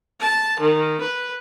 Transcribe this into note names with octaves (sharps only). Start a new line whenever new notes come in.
A5
D#3
B4